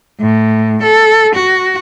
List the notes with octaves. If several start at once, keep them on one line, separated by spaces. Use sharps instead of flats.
A2
A4
F#4